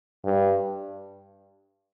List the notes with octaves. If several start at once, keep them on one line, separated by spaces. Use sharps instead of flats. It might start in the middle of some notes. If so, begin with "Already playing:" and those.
G2